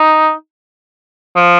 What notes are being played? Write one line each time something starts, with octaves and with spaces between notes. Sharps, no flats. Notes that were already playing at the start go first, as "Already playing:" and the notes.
Already playing: D#4
F3